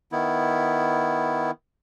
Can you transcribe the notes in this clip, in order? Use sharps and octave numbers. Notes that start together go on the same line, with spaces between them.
D#3 B3 E4